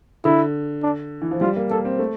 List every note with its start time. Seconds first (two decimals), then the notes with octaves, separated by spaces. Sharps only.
0.25 D3 E4
0.83 D4
1.22 E3
1.31 F3
1.41 G3 F4
1.56 A#3
1.70 A#3 A4
1.85 C4
1.99 A3